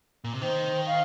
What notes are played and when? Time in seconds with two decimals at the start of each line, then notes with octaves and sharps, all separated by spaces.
0.24 A#2
0.33 C3
0.41 D#3 C5
0.86 F5